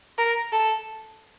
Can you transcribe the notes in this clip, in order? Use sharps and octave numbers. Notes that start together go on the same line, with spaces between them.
A#4
A4